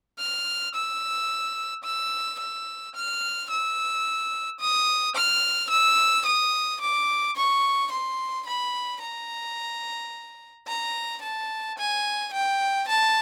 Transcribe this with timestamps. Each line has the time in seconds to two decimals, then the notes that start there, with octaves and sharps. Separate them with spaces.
0.19 F6
0.74 E6
1.84 E6
2.39 E6
2.95 F6
3.50 E6
4.60 D#6
5.16 F6
5.71 E6
6.26 D#6
6.81 D6
7.36 C#6
7.92 C6
8.46 B5
9.02 A#5
10.67 A#5
11.22 A5
11.78 G#5
12.33 G5
12.88 A5